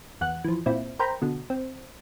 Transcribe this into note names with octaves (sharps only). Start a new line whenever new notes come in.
E2 F#5 F#6
E3 F3
A#2 C4 E4
A#4 C5 G5 A#5 B5
B2 D3
C4